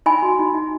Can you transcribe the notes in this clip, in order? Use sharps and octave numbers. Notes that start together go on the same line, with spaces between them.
D#4 G#5 B5
F#4
D#4
D#4